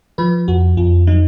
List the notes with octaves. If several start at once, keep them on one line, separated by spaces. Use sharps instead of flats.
F3 B4
F2 F#4
F2 F4
F#3 D#4